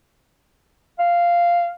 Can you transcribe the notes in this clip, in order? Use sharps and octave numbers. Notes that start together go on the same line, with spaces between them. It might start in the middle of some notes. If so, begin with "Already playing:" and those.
F5